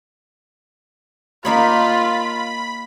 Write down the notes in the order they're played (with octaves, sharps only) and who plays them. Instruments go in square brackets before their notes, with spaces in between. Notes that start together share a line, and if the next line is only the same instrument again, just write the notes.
[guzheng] A#3 D#4 C#5 [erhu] F4 [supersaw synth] B5